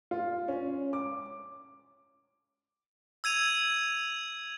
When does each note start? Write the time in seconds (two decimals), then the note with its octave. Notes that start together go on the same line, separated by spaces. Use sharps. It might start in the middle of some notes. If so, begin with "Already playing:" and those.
0.11 F4
0.48 C#4
0.93 D6
3.24 E6 G#6 D#7 F7